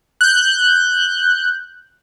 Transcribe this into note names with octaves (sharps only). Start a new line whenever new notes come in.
F#6 G6